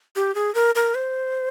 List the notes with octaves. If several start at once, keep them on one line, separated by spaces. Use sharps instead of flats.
G4
G#4
A#4
A#4
C5